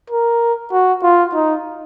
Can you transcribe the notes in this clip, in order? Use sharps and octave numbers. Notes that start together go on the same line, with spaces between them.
A#4
F#4
F4
D#4